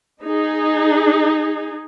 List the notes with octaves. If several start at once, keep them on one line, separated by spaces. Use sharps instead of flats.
D#4 G#4